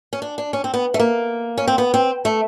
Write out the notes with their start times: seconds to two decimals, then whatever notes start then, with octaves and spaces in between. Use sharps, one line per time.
0.13 C#4
0.22 D4
0.38 D4
0.53 C#4
0.64 C4
0.74 B3
0.94 A3
1.00 A#3
1.58 C#4
1.67 C4
1.78 B3
1.94 C4
2.25 A3